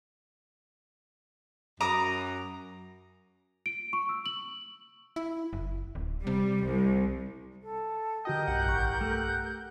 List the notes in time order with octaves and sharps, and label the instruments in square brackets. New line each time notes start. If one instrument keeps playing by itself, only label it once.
[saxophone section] F#2 [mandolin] A#5 D6 D#6
[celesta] D7
C#6
E6
F#7
[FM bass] E4
F#1
D1
[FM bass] C3 [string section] G3
[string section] C2
[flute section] A4
[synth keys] D3 F#4 G5 [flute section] G4 A#4 G6 [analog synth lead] D#5
[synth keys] B1 G2 [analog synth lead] F#5
[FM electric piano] A1 C#6
A3